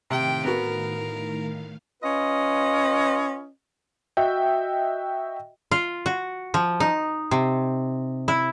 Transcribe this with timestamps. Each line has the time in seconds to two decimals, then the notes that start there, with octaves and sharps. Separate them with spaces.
0.10 A2 C3 D#3 F5 G5
0.45 B3 F#4 A#4
2.02 C#4 F4 B4 D#5
4.17 F#4 D#5 E5 G5
5.71 F4
6.06 F#4
6.54 F3
6.80 D#4
7.31 C3
8.28 E4